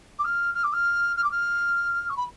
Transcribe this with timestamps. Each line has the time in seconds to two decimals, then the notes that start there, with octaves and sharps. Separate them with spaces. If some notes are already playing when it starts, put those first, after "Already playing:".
0.19 D6
0.24 F6
0.54 F6
0.63 D6
0.73 F6
1.16 F6
1.24 D6
1.31 F6
2.09 C#6
2.17 B5